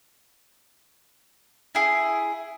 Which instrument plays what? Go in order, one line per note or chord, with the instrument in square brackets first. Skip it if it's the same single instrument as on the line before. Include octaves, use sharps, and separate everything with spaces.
[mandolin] E4 G#4